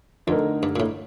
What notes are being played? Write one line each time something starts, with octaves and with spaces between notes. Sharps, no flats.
F2 D3 A3 D#4 A#4
G2
A#2
A2